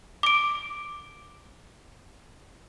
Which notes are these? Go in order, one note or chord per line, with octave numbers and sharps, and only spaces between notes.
D6 D7